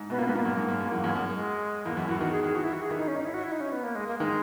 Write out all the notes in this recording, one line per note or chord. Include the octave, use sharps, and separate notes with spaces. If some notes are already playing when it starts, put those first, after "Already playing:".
Already playing: G#2
B2 B3
A#2 A#3
G#2 B3
A#2 A#3
F#2
G#2
F#2
F#2
E2
F#2
F#2 G#3
G#3
E2 A#3
F#2 E4
E2 F#4
D#3 F#4
G#4
D#3 G#4
E3 F#4
E4
F#4
G#4
D#3 E4
D#4
C#4
D#4
E4
F#4
E4
D#4
C#4
B3
A#3
G#3
A#3
D#3 G#3